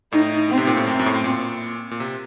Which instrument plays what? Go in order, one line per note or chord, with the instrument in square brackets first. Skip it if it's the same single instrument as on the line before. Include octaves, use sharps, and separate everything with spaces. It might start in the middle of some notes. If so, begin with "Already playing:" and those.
[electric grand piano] A2 [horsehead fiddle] D#4
[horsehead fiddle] C4
[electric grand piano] C3
A#2
A2
F#2
F#2
A2
A#2
A#2
C3